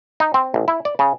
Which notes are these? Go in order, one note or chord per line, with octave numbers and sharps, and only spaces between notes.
D#4
C4
A1
E4
D5
C#3